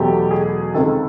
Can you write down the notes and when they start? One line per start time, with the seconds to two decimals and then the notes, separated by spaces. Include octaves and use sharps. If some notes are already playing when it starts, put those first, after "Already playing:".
Already playing: E2 B2 F#3 A3 G4
0.31 G#4
0.74 C#2 C3 D#3 A4